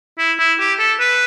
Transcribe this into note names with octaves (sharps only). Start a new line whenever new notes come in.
E4
E4
G4
A4
B4